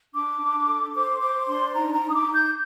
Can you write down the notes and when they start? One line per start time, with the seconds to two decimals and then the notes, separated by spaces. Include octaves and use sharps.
0.14 D4 D6
0.40 D4
0.67 A4
0.94 C5 D6
1.20 C5 D6
1.47 D4 C6
1.74 D#4 A#5
1.94 A#5
2.01 D#4
2.09 D#6
2.14 D6
2.27 D#4
2.34 G6